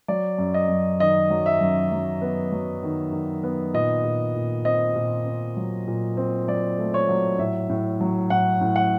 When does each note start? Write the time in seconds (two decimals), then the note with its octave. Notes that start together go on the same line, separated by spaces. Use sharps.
0.08 F#3 D5
0.38 F#2
0.54 D#5
0.69 F#2
1.00 D#3 D#5
1.30 F#3
1.46 E5
1.61 F#2
1.92 F#3
2.22 B3
2.52 F#3
2.83 D#3
3.12 D#3
3.44 B3
3.74 A#2 D#5
4.04 A#2
4.35 A#2
4.65 C4 D#5
4.95 A#2
5.26 C4
5.57 F#3
5.88 A#2
6.17 C4
6.47 F#3 D5
6.79 A3
6.94 C#5
7.09 F#3
7.39 A2 E5
7.69 A2
8.00 F#3
8.30 A2 F#5
8.61 A2
8.76 F#5